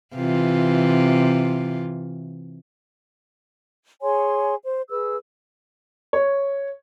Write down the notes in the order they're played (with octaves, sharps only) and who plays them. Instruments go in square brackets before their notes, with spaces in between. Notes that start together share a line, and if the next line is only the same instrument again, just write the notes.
[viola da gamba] C3 E3 F4
[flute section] G#4 C#5 G#5 C6
C5
G#4 B4 E6
[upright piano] C#5